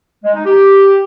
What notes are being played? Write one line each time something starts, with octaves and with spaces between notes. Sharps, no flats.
G#3
D#4
G4